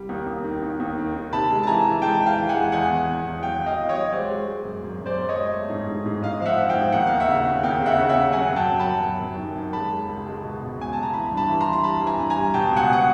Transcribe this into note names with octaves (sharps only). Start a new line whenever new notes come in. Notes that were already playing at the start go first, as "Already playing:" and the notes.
Already playing: C2 G3
D#2
D#2
D#3
D#2
D#2
D#3
D#3
C3 A5 B5
G#3
A5
E3 G#5 A#5
E3
G#3 G5 A5
E3
F5 G5
E3
F#5 G#5
G#3
E2 F#5 G#5
E2
E2
E2
F#3 F5 G5
E2
D#5 F5
E2
C#5 D#5
F#3
G#3 C5 D5
G#3
G#3
F#2
F#2
F#2
C5 D5
F#2
C#5 D#5
G#3
A3
G#2
G#2
G#2
G#2 D#5 F5
F3 F5
E5 F#5
F3
F5 G5
G#2
D#2 F#5
D#2 F5
E5 F#5
C#3
C#3
D#2 F5 G5
C#3
E5 F#5
C#3
E5 F#5
C#3
F#3 F#5 G#5
F#2
G5 A5
F#2
A5 B5
F#3
F#2
F#2
D#3
F#2
G#3 A5 B5
G#3
C#2
G#3
B2
B2
C#2 G#5
C#2 A5
A#5
E3 A5 B5
G2
A5 B5
E3
A#5 C6
E3
A#5
G3 A5 B5
E3
G#5 A#5
G2
G#5 A#5
G3
B2 G5 A5
C#2
F#5 G#5
B2 F#5